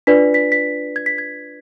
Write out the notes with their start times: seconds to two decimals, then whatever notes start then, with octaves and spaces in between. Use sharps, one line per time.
0.07 D4 F4 B4 D5 B6
0.34 B6
0.52 B6
0.96 G#6
1.06 B6
1.18 G#6